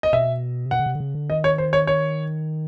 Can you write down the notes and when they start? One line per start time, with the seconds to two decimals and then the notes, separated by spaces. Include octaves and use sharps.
0.03 D#5
0.13 B2 E5
0.65 C3
0.71 B2 F#5
0.79 C#3
0.86 C3
0.95 D3
1.00 C#3
1.15 D3
1.30 D#3 D#5
1.44 C#5
1.58 C5
1.73 C#5
1.87 C#5